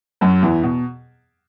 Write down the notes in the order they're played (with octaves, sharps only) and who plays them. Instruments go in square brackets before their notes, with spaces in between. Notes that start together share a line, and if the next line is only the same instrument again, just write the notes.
[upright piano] F#2 F#3
E2 E3
B2